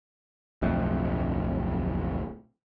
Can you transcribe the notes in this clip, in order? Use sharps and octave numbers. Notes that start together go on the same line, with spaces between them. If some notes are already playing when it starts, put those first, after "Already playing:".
D1 B1 F2 A3